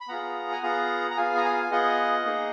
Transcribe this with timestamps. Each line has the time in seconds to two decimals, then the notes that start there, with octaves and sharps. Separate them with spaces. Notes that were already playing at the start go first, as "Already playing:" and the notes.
0.01 B5
0.08 B3 F4 G#4 F#5 A#5
0.52 G#5
0.63 B3 F4 G#4 F#5 A#5
1.11 A#5
1.17 B3 F4 G#4 F5 G#5
1.37 A#5
1.44 F5 G#5
1.62 G#5
1.71 B3 F4 G#4 D#5 F#5
2.25 A#3 D#4 G#4